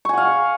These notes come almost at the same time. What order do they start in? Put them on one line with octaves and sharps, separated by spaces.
C#6 G#5 F#5 F5